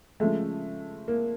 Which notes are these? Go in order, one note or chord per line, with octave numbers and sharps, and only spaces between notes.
C#3 F3 G#3 A3
A#3